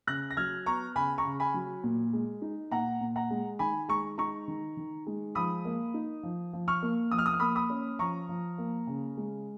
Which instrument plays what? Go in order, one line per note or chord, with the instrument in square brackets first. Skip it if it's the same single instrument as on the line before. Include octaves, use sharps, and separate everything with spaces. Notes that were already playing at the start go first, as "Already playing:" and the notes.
[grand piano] C#3 F#6 A#6
A#6
F#3 F6 G#6
B3 A#5 C#6
C#3 G#5 B5
A#5 C#6
C#3
G#5 B5
F#3
A#2
G#3
D#4
A#2 F#5 A#5
A#2
F#5 A#5
G#3
D#3 G#5 B5
G#3 A#5 C#6
D#4 A#5 C#6
D#3
D#3
G#3
F3 B5 D#6
A#3
D#4
F3
F3
C#6 F6
A#3
F3 D#6
F6
D#6
F6
A#3 B5 D#6
B5 D#6
C#4
F3 A#5 C#6
F3
A#3
C#3
G#3